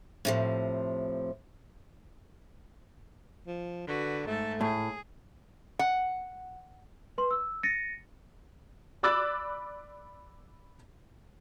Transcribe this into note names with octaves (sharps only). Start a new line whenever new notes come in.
A2 C3 F3
F3
D3 F#4 B4
G#2 A3 A4
A2 G#4
F#5
B4 C6
E6
A6 A#6 C#7 D#7
D5 B5 D6 E6 F#6 A6